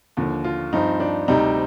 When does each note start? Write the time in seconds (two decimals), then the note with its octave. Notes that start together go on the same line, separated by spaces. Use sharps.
0.17 D#2 D3 F3
0.44 F4
0.73 G2 F3 C4 D#4
1.00 D4
1.28 D2 C3 G3 C4 D#4